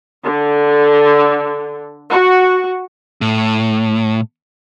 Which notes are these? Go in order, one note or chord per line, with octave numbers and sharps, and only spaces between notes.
D3
F#4
A2